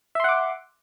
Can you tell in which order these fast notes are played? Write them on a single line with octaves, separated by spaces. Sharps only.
E5 C6 F#5 D6